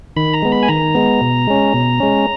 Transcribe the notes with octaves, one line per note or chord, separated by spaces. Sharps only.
D#3 B5
A#5
G#3 B3
B5
G#5
D#3 A#5
G#3 B3
B2
G#3 C#4
B2
G#3 C#4